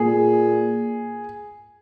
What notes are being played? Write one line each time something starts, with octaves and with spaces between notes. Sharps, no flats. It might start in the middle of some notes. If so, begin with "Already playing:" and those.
Already playing: A#2 G#4